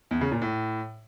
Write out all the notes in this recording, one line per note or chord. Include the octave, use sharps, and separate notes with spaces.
E2
C#3
A#2
A2